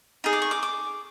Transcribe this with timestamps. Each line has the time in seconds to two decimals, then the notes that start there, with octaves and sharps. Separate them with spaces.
0.24 D#4 G#4
0.33 D6
0.42 C#6
0.51 D6
0.63 D6